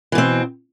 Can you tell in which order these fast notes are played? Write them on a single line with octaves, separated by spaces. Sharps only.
E3 B2 C4